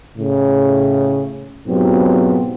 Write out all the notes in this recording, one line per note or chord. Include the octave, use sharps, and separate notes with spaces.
A2 C#3
G#2 B2 F#3 C4 F4 G4